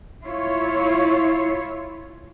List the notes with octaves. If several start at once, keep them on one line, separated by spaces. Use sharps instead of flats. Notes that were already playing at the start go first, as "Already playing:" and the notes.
E4 F4 C#5